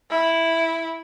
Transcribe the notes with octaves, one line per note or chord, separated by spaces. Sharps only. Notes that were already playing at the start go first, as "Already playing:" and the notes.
E4